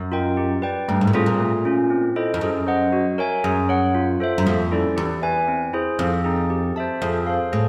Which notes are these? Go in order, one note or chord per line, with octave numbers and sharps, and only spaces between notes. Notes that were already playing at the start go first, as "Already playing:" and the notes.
Already playing: F#2
F4 A#4 D#5 G5
G4
B4 D5 G5
G2 A3
G#2
A#2
A2 C4 F4 G#4
A#2
A3
C#4 F4
C4
E4 A4 C5 D#5
F2
F#2 G#4
C5 D#5 F#5
F#4
A#4 C#5 E5 G#5
F#2 G#4
C#5 F#5
F4
A4 C5 E5
F#2
F2 A#3
C#4 E4 A4 D5
E2 G4
B4 E5 G#5
C4
E4 G#4 C5
F2 C4
D#4 G#4
G4
C5 E5 A5
F2 G#4
C5 F5
A2 G#4